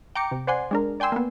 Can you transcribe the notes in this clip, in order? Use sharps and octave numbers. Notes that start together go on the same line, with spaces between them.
G5 A#5 D6 C#7
C3
C5 D5 F#5 G#5 C6
G#3 D4 A#4
D5 G5 G#5 C6 E6
A#3 B3